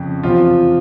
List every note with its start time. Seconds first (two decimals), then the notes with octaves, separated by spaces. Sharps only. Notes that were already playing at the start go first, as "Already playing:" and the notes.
Already playing: F2 C#3
0.23 E2 C3 F3 F4